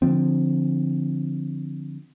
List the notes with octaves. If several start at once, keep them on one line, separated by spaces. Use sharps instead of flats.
D3 F3 C4